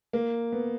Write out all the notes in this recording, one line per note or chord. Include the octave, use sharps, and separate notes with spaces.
A#3
B3